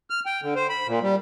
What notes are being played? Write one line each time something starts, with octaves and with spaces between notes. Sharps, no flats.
F6
G5
D3
C5
B5
A#2
G3